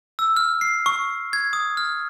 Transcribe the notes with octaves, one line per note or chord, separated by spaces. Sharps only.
E6
F6
C7
C#6
G#6
D#6
F6